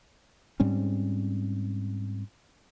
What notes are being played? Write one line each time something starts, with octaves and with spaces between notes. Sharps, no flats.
G#2 G3 C4 C#4